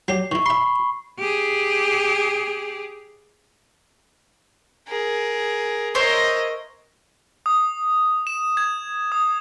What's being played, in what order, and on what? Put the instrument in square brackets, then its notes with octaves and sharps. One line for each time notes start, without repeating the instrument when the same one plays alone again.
[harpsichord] F#3 G4 [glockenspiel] C7
[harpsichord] D#3 E4 [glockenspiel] C#6
[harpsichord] E5 C6 [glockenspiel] B5
[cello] G4 G#4
[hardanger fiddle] G#4 A#4
[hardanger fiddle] A#4 D#5 [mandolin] C5 C#5 E5
[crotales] D#6
E7
G#6
D#6